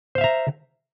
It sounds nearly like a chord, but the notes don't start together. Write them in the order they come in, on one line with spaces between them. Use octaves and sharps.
C5 F5 E5 A#5